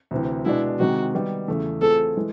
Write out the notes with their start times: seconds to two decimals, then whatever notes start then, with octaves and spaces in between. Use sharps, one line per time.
0.11 D2 C3 E3
0.45 B2 G#3 B3 D4 E4
0.80 C3 D#3 G#3 C4 F#4
1.14 D#3 G3 B3
1.48 E2 C#3 E3 A3
1.82 E3 A3 C4 F4 G#4 A4
2.17 E3 G#3